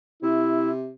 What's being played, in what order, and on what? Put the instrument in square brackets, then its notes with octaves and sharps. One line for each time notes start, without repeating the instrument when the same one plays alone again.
[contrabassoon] C3 [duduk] E4